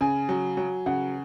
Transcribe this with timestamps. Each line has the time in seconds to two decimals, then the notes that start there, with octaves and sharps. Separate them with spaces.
0.01 C#3 G#5
0.29 F#3
0.57 F#3
0.86 C#3 F#5